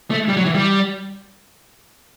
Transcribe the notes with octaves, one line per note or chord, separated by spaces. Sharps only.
A3
G3
F#3
E3
G3